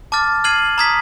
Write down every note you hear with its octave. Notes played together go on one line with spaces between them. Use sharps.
A5 D6 F6 A6
F6 G#6 C7 D#7 F#7
A#5 D#6 G#6 B6